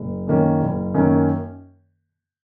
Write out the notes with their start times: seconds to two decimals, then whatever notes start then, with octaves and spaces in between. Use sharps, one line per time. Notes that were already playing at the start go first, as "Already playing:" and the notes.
Already playing: F#1
0.27 F#2 D#3 A#3 C#4
0.61 F#1
0.94 F#2 D#3 A#3 C#4